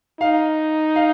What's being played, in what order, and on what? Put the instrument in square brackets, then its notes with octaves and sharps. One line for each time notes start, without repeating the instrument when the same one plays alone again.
[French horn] D#4 [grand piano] F5
[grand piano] F5